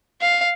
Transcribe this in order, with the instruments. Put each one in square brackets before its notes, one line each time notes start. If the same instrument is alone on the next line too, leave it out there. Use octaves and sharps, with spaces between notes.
[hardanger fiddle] F5